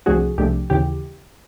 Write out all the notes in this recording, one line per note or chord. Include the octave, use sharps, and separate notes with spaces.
C2 C3 F3 A3 D4 F#4 G#4
C2 C3 F3 A3 D4 G4
D#2 C#3 E3 G4